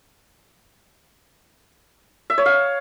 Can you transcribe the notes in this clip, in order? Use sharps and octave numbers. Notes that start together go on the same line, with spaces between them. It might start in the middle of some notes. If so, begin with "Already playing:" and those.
E5
C#5
F5